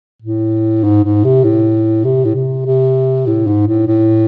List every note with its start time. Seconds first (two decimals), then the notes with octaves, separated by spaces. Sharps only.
0.22 A2
0.84 G#2
1.04 G#2
1.24 C3
1.44 A2
2.04 C3
2.25 A2
2.35 C3
2.66 C3
3.26 A2
3.47 G#2
3.67 A2
3.87 A2